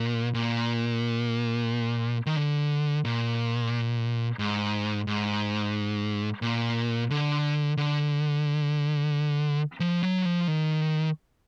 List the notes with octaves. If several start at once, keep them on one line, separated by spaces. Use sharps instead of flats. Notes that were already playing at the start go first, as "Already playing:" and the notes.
Already playing: A#2
A#2
D#3
D3
A#2
G#2
G#2
A#2
D3
D3
F3
F#3
F3
D#3